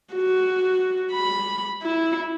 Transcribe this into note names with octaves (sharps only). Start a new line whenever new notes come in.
F#4
B5
E4